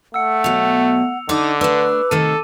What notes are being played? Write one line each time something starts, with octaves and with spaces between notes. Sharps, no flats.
A3 F#5 E6 C#7
B2 F#3 F7
D3 D#4 A4 D#5 D6
A3 D4 B4 D6 E6
C3 D#3 A3 A4 D#7